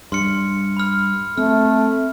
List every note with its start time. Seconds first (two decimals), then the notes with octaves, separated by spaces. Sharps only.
0.12 G2 C6 F6 C#7
0.77 B5 F6
1.38 A3 C4 F6